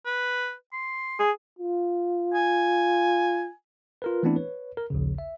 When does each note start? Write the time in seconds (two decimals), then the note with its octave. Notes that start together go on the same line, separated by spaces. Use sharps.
0.06 B4
0.73 C6
1.19 G#4
1.59 F4
2.34 G#5
4.02 F4 A#4 B4
4.23 E3 A3 B3 C4 D4 E4
4.36 B4 C#5
4.77 A#4
4.90 A#1 D#2 C#3
5.18 E5